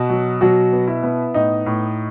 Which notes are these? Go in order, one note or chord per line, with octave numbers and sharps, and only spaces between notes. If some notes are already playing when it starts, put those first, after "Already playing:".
Already playing: B2 F#4
F#3
B2 F#3 F#4
B3
E4 E5
B3
A2 D#4 D#5
A2